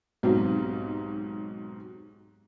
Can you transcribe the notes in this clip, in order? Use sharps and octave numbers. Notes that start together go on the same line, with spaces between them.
B1 G#2 F#3 C4 F#4 G4